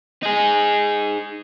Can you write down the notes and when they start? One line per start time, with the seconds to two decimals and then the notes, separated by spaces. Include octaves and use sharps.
0.23 D#4 G#4